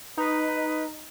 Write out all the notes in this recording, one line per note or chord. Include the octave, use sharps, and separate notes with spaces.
D#4 B4